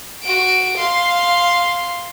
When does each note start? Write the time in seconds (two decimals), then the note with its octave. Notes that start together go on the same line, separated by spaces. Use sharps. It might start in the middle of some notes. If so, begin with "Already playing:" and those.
0.23 F#4 D7
0.78 F5 C6